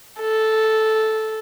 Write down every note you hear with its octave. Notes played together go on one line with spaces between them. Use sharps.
A4